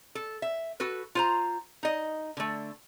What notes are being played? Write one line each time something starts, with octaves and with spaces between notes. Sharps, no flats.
A4
E5
F#4 A4 B4
F4 C5 A#5
D#4 D#5
D3 A3